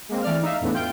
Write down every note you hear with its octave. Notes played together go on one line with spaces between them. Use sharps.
G#3 A#3 C4
E3 A3 D5 F6
D#4 E5 F5
E2 A2 A3 B3 D4
F4 G5 G6